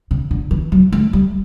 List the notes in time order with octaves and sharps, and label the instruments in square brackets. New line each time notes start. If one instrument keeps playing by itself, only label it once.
[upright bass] C#3
D3
E3
F#3
A3
G3